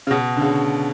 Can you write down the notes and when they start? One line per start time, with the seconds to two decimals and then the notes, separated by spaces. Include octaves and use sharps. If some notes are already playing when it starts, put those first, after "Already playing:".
0.07 C#3
0.11 B2
0.37 D3
0.41 C#3